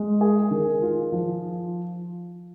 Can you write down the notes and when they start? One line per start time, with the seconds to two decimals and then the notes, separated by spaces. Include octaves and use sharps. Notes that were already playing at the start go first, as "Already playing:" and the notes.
Already playing: G#3
0.21 G#4
0.51 D#3
0.82 F4
1.12 F3